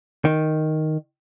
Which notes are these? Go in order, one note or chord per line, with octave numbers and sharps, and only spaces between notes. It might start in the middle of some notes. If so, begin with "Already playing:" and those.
D#3